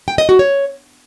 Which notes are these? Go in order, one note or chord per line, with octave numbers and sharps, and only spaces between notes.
G5
D#5
F#4
C#5